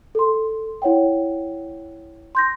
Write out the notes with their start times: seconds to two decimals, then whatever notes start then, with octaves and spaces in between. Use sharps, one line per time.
0.15 A4 C6
0.82 E4 C#5 F#5 G5
2.35 C6 G6 A#6